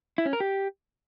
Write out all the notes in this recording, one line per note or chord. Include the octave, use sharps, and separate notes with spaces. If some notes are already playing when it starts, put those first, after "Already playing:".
E4
C#4
A#4
G4